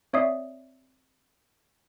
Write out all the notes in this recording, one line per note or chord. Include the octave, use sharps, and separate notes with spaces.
C4 C#5 D5 E5 D#6 C7